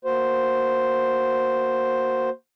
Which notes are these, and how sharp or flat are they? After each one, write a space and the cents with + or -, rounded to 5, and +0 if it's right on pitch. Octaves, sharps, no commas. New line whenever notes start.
A#3 +0 F#4 +0 C5 +0